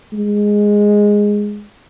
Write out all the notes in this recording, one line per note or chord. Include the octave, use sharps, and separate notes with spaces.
G#3